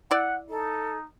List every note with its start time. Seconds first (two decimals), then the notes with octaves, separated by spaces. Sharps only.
0.11 E4 D5 F#5
0.50 D#4 A4